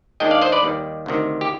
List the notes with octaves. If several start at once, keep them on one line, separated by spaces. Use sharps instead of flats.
D#2 D#3 G#3 D4 D#5 G5
D5 F5
C5 D#5
B4 D5
D#2 D#3 G3
D2 C3 D#3
G4